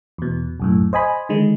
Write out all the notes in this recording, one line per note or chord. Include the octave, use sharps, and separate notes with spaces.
E2 B2
B1 F#2 A2
C5 D#5 G#5 B5
D3 D#3 G#3